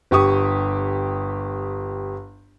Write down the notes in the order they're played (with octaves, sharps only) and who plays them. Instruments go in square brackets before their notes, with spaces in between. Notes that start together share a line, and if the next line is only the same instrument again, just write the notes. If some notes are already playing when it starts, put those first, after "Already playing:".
[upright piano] G1 G4 C#6 D#6